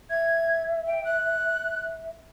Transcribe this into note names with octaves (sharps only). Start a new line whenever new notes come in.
E5 G#6
G5
F#6